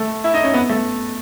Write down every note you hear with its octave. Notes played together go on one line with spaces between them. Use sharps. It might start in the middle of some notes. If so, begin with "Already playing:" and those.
Already playing: A3
E4
D#4
C#4
B3
A3